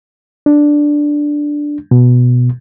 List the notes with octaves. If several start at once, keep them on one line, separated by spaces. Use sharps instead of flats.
D4
B2